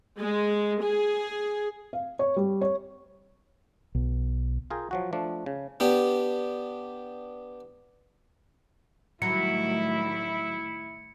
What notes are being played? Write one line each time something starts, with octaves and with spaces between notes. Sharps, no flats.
G#3
G#4
F5
C#5
G3
C#5
B1
F4 G#4 A#4 G5
F3 F#3 F#4
F3 A3 D4
C#3
B3 D4 G4
A2 D#3 F#3 G3 E4 C#7